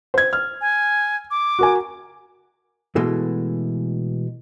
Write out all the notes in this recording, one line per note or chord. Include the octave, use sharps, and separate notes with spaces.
C5 G#6
F6
G#5
D6
F#4 A#4 G#5
B2 E3 G#3 A3